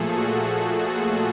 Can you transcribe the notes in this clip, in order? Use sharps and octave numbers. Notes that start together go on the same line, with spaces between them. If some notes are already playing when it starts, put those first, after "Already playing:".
Already playing: A#2 F3 A3 G#4 A4
F#4
F#4